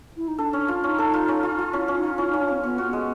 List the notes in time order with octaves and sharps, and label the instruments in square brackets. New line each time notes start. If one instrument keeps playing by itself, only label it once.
[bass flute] E4
D#4
[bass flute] D4 [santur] A4
[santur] C#4
F4
[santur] C#4 [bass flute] D#4
[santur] A4
F4
C#4
F4
F4
[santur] C#4 [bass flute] E4
[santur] C#4
[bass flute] D#4
[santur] F4
[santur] C#4 [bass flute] E4
[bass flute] D#4
[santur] C#4
[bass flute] D4
[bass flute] C4 [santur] C#4
[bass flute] B3 [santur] C#4
[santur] F#4
[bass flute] B3
[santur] G#3